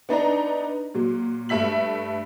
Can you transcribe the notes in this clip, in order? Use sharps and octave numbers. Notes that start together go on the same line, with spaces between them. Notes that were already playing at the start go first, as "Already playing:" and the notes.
B3 D4 D#4 A#5
A#2 F#3
G2 A3 E5 B6 F#7